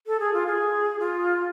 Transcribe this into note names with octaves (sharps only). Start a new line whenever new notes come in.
A4
G#4
F4
G#4
F4